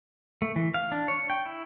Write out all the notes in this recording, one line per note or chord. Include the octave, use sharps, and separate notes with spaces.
A3
E3
F5
D4
C#5
G5
E4